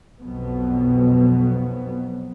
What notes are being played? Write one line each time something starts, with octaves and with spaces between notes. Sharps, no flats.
B1 F2 B2 F#3 B3